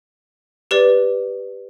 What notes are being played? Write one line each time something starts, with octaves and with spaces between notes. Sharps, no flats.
G4 B4 D5